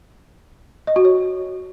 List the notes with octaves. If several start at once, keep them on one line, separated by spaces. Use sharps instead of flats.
D#5
F#4
C#5